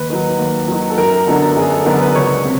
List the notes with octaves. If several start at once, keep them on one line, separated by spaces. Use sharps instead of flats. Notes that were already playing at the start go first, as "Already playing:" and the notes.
Already playing: D#2 B4
D#3 F#3
D#2
D#3 F#3
A4
F#2 A#4
D3 F#3 B3 D4 A4
F#2 G#4
A4
D3 F#3 B3 D4 A#4
B4
C#2 C#5
C3